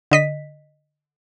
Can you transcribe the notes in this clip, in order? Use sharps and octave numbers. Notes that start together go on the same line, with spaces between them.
D3 D#5 B6